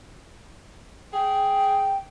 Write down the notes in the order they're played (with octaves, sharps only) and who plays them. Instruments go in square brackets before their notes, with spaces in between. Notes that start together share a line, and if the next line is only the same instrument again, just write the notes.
[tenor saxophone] G#4 [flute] G5